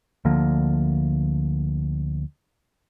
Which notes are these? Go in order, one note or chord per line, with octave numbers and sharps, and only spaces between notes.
D2 D3 F3 A#3